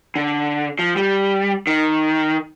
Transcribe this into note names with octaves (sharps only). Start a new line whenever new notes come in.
D3
F3
G3
D#3